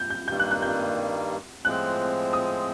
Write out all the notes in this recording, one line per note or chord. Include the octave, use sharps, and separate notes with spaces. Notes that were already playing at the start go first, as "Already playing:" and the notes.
Already playing: G6
G6
G2 D#3 G3 A#3 G6
F#6
F#6
G6
A2 F3 G#3 C4 F#6
D#6